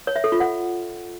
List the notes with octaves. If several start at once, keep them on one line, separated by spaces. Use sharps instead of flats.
C#5
E5
A4
F4
F#5